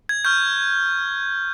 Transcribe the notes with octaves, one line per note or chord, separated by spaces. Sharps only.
G#6
C#6 F6 G6